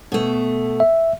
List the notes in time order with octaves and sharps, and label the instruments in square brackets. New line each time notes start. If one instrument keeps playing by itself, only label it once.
[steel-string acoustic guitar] B2 A3
[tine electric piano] E5